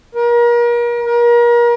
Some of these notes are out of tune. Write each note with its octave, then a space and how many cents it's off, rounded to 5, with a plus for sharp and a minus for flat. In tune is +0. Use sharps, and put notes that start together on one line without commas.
A#4 +35
A#4 +35